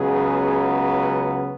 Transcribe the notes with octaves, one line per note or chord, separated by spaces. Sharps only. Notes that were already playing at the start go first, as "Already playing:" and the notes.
Already playing: C#2 C#3 F#3 B3 G#4